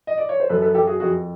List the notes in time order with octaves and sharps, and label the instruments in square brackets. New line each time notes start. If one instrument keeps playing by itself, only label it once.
[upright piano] D#5
D5
C#5
C5
F#2 A4 B4
A4 B4
F#2 G4 A4
F#4 G#4
F2 F#4 G#4